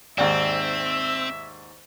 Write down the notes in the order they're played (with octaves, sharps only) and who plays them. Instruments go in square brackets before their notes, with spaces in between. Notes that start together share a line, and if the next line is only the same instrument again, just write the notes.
[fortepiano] D#2 G#2 [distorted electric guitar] C4 [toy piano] D5 G5 [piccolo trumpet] E5